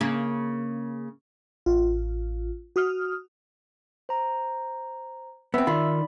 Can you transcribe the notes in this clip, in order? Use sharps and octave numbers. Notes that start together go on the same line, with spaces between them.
C#3 A#3
A1 F4
F#4 D#6 F6
C5 A#5
B3 C4 E5 E6
D#3 F4 D5 B5